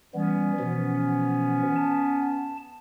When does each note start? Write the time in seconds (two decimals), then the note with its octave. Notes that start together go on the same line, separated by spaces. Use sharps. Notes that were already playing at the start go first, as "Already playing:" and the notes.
0.14 E3 G3 B3 C#4
0.59 B2 E3 F3
1.76 A5